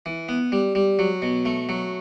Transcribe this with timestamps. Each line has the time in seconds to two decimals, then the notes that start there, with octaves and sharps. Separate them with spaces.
0.06 E3
0.29 B3
0.52 G3
0.75 G3
0.99 F#3
1.22 B2
1.45 A3
1.69 F#3